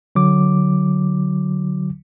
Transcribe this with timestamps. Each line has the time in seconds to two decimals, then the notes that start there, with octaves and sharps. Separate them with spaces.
0.15 D3 F#3 D6